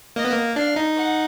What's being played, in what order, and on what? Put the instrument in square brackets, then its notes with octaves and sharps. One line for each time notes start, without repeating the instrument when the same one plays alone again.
[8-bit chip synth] A#3 [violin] D#5
[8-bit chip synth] B3
A#3
[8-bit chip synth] D4 [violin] F5
[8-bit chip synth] D#4
[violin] F#5